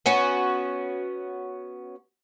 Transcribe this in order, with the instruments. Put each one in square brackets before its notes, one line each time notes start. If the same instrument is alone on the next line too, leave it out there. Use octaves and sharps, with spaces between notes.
[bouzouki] B3 C#4 F#4